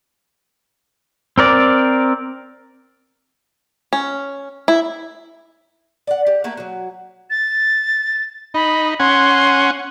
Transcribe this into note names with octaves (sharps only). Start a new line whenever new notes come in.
C4 A#4 D5
C#4
E4
D5 F#5
G4
A3 A#3 F#4 G4
F#3 F#4
A6
D#4 B5
C#4 F#5 G#5 C6